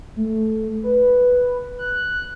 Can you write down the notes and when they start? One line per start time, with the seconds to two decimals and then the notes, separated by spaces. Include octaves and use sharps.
0.16 A3
0.83 B4
1.78 F#6